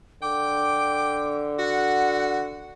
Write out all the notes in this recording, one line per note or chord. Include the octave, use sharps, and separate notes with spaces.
D3 G5 D6
F#4 F#5